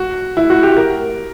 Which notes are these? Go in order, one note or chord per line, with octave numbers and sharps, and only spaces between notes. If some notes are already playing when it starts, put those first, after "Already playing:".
Already playing: F#4
E4
F#4
G4
A#4